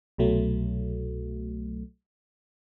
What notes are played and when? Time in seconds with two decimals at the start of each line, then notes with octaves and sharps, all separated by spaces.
0.18 C2 B2 F#3 A3